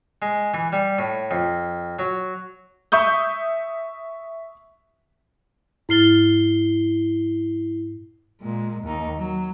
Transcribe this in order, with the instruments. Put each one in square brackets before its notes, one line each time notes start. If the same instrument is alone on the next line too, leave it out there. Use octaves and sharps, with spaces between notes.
[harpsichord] G#3
E3
G3
A2
F2
F#3
[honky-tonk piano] E5 C#6 D#6 G6
[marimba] G#2 F6 A6 [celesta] E4 C7 G7
[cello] A#2 G#3
D#2 D#4
F#3